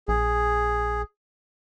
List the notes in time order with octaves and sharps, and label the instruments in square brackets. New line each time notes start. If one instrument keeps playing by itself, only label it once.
[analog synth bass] A#1 [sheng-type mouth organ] G#4